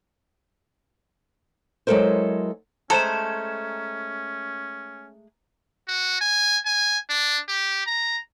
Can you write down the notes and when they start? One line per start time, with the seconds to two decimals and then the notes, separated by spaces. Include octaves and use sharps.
1.87 F#3 G#3 E4 A4 A#4 C5
2.90 G#3 A3 C#4 A4 C5 A#5 E7
5.88 F#4
6.21 G#5
6.65 G#5
7.10 D4
7.48 G4
7.86 A#5